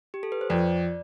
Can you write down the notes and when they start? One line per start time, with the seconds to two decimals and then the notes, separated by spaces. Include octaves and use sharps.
0.14 G4
0.23 A4
0.32 B4
0.41 C5
0.50 F2 D5